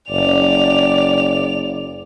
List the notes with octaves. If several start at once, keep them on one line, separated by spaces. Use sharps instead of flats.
F#1 D5 F7